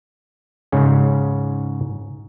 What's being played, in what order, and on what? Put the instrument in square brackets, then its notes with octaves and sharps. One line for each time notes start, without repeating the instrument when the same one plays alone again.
[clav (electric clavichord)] G#2 C#3 C#4